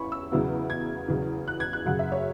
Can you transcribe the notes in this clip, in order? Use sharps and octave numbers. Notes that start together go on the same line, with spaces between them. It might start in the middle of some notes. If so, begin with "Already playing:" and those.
Already playing: E2 E3 C#4 E4 B5 C#6
E6
E2 C#3 F#3 B3 E4
G#6
E2 C#3 F#3
F#6
G#6
F#6
F#2 C#3 F#3 F#5
E5
C#5